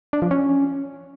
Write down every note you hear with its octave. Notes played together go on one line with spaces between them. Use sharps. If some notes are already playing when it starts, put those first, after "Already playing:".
D4
F3
C#4